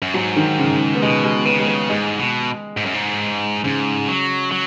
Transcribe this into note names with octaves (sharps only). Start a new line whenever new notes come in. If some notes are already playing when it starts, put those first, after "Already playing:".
F#2
G#2 F#3
D#3
C#3
B3
B2 G#3
G#3
C#3 B3
G#3
B3
G#2 G#3
B2
G#2
F#2
G#2
G#2 C#3
F#3
F#3